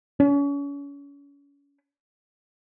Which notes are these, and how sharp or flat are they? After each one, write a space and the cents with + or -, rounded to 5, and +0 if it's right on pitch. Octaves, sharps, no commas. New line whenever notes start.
C#4 +35